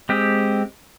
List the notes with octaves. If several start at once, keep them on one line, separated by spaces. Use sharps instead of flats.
G#3 C4 G4